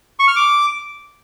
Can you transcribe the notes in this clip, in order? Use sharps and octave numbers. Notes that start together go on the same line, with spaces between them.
C#6
F6
D6